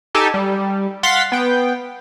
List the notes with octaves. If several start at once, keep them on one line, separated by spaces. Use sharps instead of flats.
D#4 G4 A4 G#5 A5
G3
F5 F#5 C6 A6 B6
B3 G5